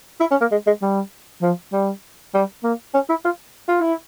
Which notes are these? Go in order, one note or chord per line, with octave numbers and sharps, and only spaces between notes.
E4
C#4
A#3
G#3
G#3
G3
F3
G3
G3
A#3
C#4
E4
F4
F4
E4